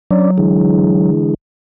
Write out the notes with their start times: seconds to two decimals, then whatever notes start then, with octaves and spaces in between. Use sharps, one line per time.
0.11 F#3 C#4 D4 D5
0.38 D3 E3 G#3